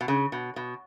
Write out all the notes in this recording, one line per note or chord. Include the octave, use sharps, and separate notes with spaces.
B2
C#3
B2
B2